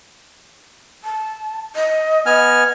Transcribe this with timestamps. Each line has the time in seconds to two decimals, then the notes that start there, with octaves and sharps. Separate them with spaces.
1.04 A5
1.76 D#5
2.26 B3 D#5 G#5 F6